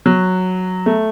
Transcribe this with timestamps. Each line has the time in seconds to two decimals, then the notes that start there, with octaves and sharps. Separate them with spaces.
0.06 F#3
0.86 A3